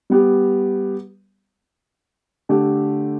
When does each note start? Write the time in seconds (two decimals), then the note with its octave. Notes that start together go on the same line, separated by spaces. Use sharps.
0.10 G3 B3 G4
2.49 D3 A3 G4